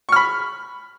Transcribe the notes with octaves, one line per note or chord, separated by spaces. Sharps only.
B5 C#6 F6